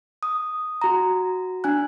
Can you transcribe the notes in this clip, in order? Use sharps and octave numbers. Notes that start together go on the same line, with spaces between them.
D#6
F#4 A#5
D4 G#5 F#6